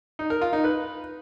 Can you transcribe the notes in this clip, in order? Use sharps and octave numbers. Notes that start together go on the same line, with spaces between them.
D#4
A#4
F4
D#4
B4